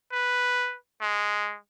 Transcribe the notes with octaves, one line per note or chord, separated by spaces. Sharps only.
B4
G#3